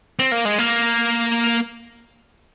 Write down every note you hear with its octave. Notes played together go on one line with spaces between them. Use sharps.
C4
A#3
G#3
A#3